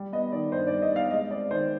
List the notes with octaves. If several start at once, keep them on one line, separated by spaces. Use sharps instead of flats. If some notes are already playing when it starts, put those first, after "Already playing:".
Already playing: G3
B3 D#5
D#3 D5
G2 C5
D5
G3
D#5
B3 F5
G#3 D#5
C4 D5
D#3 C5